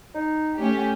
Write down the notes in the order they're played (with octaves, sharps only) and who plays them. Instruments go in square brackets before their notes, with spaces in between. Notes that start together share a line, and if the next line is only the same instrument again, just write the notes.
[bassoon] D#4
[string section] A3 C#4 G4